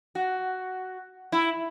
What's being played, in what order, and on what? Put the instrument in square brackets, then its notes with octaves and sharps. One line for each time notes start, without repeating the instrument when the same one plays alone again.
[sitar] F#4
E4